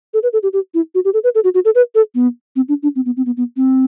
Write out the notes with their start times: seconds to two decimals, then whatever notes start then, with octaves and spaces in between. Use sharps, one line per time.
0.14 A4
0.23 B4
0.33 A4
0.43 G4
0.53 G4
0.74 E4
0.95 F#4
1.05 G4
1.14 A4
1.24 B4
1.35 A4
1.44 F#4
1.54 F#4
1.65 A4
1.75 B4
1.95 A4
2.15 B3
2.56 C4
2.68 D4
2.83 D4
2.96 C4
3.06 B3
3.17 C4
3.26 B3
3.37 B3
3.56 C4